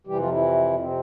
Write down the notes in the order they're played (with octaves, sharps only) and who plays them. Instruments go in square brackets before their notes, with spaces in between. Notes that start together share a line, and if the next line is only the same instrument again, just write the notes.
[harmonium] F2 C3 E3 G3 G4
F3 F4
E3 E4
C3 C4